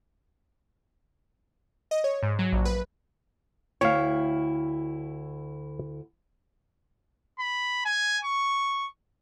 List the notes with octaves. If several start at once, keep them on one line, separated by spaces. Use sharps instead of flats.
D#5
C#5
G#2
F#3
A#1
B4
D2 E4 C#5 F5 G5
B5
G#5
C#6